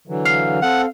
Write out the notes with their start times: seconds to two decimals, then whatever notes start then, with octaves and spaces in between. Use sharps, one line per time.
0.07 D3 E3 F#3
0.25 F5
0.62 C4 A4 F#5